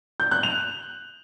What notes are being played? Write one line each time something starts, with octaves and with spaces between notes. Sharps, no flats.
G6
F#6
F7